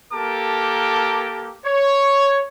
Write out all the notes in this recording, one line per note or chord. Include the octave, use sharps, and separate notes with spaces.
A#3 G4 A4 A#4 A5 D6
C#5